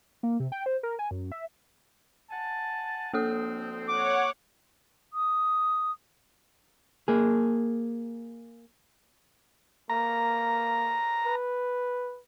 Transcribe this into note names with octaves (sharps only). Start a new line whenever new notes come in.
A#3
C3
G5
C5
A#4
G#5
F#2
E5
F#5 G#5 A5
D2 F3 A#3 C4 A4 D#6
C#5 F#5 D6
D#6
A#3 G#4
A#3 A#5
B4